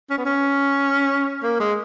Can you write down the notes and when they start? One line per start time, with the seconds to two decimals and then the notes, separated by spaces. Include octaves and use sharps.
0.11 C#4
0.18 B3
0.26 C#4
1.43 A#3
1.60 G#3